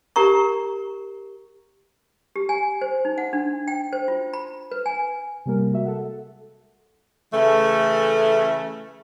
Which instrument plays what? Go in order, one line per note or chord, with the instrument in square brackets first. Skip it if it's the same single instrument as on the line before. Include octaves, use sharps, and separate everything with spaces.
[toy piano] G4 A#4 A#5 C#6
G4
G#5
C5
D#4
F#5
D4
G5
C5
F4
B5
B4
G#5
[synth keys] C3 G3 A#3 A#4
G#3 F#4 E5
A4 F#5
[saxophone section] C#3 E3 A3